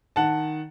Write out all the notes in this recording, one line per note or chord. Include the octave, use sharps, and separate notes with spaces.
D#3 F#5 A5